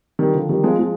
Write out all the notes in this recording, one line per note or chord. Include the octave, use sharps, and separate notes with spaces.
D#3 G3
D3 F3
D#3 G3
F3 G#3
F3 G#3